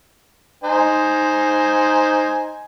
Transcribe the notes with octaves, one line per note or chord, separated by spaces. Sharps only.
D#4 C5 G#5